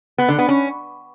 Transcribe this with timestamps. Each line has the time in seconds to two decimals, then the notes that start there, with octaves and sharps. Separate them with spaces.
0.18 B3
0.29 D3
0.39 B3
0.49 C#4